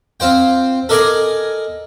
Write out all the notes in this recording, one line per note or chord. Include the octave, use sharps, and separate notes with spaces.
C4 F4 C5 G5
A4 A#4 D5 D#5 G#5 D#6